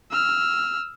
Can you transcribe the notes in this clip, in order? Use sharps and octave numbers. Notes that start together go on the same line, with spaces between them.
E6 F6